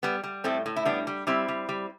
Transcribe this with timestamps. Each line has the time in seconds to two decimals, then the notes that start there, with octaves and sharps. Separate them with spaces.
0.03 G3 B3
0.24 G3
0.44 A2 A3 C4
0.66 A2
0.76 E4
0.85 G3 B3 D4
1.07 G3
1.27 G3 C4 E4
1.48 G3
1.69 G3